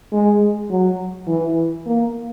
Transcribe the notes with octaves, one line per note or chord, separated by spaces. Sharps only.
G#3
F#3
E3
A#3